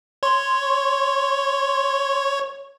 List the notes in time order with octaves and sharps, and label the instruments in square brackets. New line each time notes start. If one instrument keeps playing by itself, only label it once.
[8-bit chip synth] C#5 [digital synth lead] C6